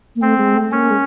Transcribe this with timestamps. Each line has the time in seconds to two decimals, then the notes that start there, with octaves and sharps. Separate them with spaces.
0.16 A#3
0.21 A3 C4
0.38 G#3
0.56 A3
0.72 A#3 C#4
0.91 G#3